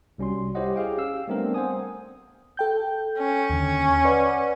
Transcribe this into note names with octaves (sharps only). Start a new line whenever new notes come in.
C2 G3 C#4 F#4 C6
E4 G4 C5 C#5 D#5 F#5
G4 G#4 F5 G5
C#4 F5 E6
G3 A3 B3 C4 D4 A#4
C5 F#5 G#5 D#6
A4 G5 G6
C#4
D#2 D3
B4 D5 F#5